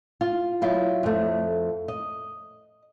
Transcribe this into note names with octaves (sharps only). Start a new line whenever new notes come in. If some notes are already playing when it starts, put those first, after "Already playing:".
F4
F#3 E4 F4
F2 A3
D#5